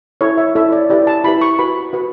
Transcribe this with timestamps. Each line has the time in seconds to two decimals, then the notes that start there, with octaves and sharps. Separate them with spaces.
0.21 E4 A4 C#5
0.38 E5
0.55 E4 A4 C#5 E5
0.72 D5
0.90 E4 G4 B4 D5
1.07 A5
1.24 E4 G4 B4 B5
1.42 C#6
1.59 F#4 B4 B5
1.93 F#4 B4